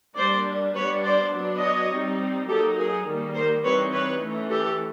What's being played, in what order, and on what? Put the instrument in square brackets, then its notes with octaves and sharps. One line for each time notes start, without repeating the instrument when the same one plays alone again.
[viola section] G3 A#3 D4 C5 D5
G3 B3 D4 B4 C#5
C5 D5
F#3 B3 D4
C#5 D#5
G3 C4 D#4
F#3 A#3 D#4 G4 A4
G#4 A#4
D#3 G3 A#3
A#4 C5
E3 G3 C4 D#4 B4 C#5
B4 C#5
E3 A3 C#4
G4 A4